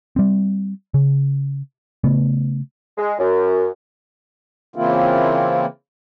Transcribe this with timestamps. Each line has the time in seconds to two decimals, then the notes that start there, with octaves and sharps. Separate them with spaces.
0.16 G3 C4
0.94 C#3
2.04 C#3 A3 B3
2.98 G#3
3.19 F#2
4.76 C#3 E3 A#3 C4 E4 F4